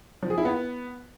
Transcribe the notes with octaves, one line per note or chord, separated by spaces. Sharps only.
F3
G#4
E4
B3